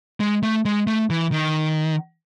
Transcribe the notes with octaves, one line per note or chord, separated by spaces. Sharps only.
G#3
A3
G#3
A3
E3
D#3